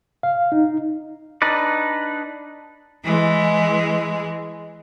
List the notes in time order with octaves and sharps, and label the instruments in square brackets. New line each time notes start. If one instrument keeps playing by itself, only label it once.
[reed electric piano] F5
D#4
[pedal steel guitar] D4 D#4 B4 D5
[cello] E3 G#3